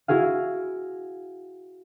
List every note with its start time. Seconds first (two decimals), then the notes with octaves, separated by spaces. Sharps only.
0.08 E4 F#4 G#4 F5